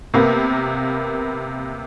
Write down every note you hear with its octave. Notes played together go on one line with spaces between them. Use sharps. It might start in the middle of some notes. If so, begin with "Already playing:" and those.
C3 A#3 B3